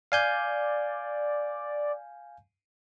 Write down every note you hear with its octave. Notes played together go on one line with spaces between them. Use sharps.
D5 F5 G#5 G6